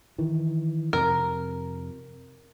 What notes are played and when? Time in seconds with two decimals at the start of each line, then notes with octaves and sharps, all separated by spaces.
0.18 D#3 E3
0.93 F2 C3 A#4